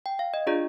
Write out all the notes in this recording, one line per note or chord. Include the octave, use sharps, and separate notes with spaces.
G5
F5
D#5
D4 F4 G#4 D5